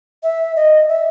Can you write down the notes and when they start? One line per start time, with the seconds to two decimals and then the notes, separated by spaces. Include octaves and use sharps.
0.23 E5
0.56 D#5
0.89 E5